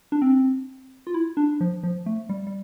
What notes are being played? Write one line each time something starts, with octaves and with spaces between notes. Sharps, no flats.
D4
C4
F4
E4
D4
F3
F3
A3
G3
G3